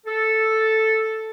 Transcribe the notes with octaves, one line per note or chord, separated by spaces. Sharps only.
A4